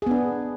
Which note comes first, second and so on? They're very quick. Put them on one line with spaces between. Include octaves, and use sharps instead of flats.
G#4 B3 D4